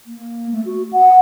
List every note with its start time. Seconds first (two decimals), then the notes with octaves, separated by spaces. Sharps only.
0.06 A#3
0.52 A3
0.66 F#4
0.93 F#5